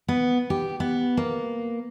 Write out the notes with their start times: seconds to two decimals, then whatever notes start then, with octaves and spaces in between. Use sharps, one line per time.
0.08 B3
0.50 G4
0.80 B3
1.17 A#3